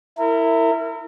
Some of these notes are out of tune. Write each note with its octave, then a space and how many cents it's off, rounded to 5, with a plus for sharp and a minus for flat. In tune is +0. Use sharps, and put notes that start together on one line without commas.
E4 +0 A#4 -35